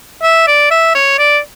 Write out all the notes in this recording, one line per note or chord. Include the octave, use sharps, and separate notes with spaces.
E5
D5
E5
C#5
D5